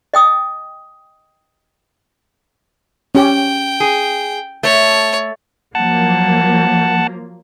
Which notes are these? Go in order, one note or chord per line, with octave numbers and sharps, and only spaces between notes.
D#5 G5 D#6
C#4 G4 G5
G#4
A3 C#5
F3 F#3 A#3 F#5 A5